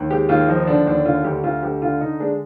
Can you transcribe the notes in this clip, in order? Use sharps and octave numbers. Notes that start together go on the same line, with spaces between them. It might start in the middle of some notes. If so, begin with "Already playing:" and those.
Already playing: D#2
G#3 G4
D#2 F4
F3 D#4
D3 D4
D#2 D4
D3 F4
D2 G4
D2 F4
D2 G4
D3 F4
D3 D#4
G#3 D4